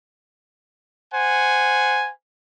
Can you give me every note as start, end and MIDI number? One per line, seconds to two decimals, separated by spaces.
1.12 2.09 72
1.12 2.09 78
1.12 2.09 80